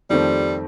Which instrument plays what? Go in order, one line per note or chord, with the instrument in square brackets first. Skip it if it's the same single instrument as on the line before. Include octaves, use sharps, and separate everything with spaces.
[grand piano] F2 D#3 A3 C4 [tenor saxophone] G3